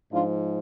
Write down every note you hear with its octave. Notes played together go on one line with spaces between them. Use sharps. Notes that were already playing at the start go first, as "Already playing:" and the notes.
G#2 F3 D4 F4